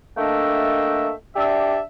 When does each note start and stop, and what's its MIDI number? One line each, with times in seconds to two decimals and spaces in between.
0.18 1.11 57
0.18 1.11 58
0.18 1.11 62
0.18 1.11 75
0.18 1.11 76
0.18 1.11 79
1.36 1.81 62
1.36 1.81 67
1.36 1.81 74
1.36 1.81 76